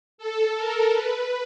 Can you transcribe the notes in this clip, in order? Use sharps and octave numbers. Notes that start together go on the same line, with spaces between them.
A4
A#4
B4